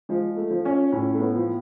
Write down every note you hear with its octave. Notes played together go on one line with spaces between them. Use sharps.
F3 G#3
A3
F3
C#4
A2 C#4
A3
B3
F3